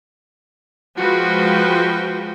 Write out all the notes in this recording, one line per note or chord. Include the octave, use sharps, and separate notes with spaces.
F3 G#3 F#4 B4 G5